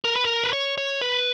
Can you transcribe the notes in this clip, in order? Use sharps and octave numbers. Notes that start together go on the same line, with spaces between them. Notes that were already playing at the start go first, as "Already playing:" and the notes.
A#4
B4
A#4
B4
C#5
C#5
B4